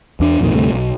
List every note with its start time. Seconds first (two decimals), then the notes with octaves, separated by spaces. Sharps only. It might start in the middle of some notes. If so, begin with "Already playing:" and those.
0.20 E2 D4
0.39 B1 F2 A#2 D#3
0.53 D2 G2 C3 A3
0.73 B1